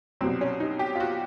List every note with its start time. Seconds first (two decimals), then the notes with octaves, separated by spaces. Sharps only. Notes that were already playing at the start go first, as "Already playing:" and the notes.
0.21 C2 B2 F#3 C4
0.41 C#4
0.60 D#4
0.79 G4
0.95 F4
1.00 F#4